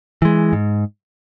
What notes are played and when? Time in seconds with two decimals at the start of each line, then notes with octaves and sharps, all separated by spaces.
0.22 E3 G#3
0.53 G#2